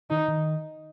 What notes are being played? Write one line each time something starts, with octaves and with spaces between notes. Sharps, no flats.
D#3 D#4
D#3